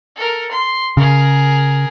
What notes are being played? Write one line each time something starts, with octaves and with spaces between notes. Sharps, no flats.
A4 A#4
C6
C#3 G#4 A#4